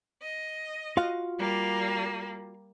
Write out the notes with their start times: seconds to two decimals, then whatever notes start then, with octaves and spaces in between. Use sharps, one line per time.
0.22 D#5
0.97 F4 F#4 F5
1.39 G3 A#3